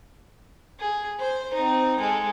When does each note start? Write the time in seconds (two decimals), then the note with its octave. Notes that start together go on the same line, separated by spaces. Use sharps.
0.79 G#4
1.20 C5
1.54 C4 D#4
1.99 G#3 A4